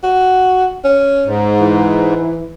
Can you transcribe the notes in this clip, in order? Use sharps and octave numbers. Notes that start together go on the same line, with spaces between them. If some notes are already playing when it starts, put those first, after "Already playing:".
F#4
C#4
G#2
E3